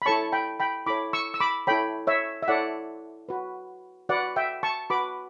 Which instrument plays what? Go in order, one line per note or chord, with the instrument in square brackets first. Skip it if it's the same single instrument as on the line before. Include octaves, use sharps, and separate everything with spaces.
[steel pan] B5
E4 A4 C#5 A5 C#6
G5 B5
G5 B5
E4 A4 C#5 B5 D6
C#6 E6
E6
B5 D6
E4 A4 C#5 G5 B5
C#5 E5
E5
E4 A4 C#5 D5 F#5
F#4 B4
F#4 B4 D5 F#5
E5 G5
A5 C#6
F#4 B4 B5 D6